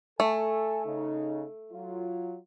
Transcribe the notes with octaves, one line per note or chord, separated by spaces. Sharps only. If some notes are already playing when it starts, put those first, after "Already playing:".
A3 A4 G#5
C#3 D#4
F#3 F4